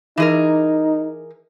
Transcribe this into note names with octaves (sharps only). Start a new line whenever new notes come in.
E3 D#4 G#4 A#4